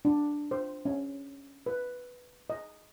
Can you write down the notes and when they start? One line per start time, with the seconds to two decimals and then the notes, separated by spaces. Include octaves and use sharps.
0.05 D4
0.51 C5
0.85 C#4
1.66 B4
2.50 D#5